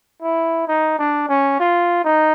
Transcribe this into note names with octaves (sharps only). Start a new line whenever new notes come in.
E4
D#4
D4
C#4
F4
D#4